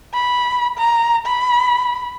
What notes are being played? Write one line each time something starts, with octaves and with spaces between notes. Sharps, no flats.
B5
A#5
B5